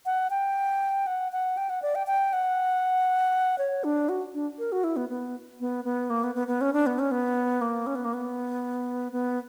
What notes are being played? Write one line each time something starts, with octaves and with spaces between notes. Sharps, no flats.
F#5
G5
F#5
F#5
G5
F#5
D5
G5
G5
F#5
C#5
D4
F#4
D4
A#4
F#4
E4
B3
B3
B3
B3
A#3
B3
B3
B3
C#4
D4
B3
C#4
B3
A#3
C#4
B3
A#3
B3
B3